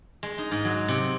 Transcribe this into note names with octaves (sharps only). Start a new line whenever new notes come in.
G#3
D#4
G#2
F#3
C3